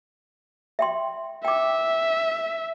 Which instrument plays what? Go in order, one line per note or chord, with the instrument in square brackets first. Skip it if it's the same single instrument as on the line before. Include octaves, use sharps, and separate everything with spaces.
[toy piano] E5 G5 C6
[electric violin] E5 [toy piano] G5 D6